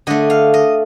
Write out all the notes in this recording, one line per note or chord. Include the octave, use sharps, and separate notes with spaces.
D3 A3 D#5
F5
D#5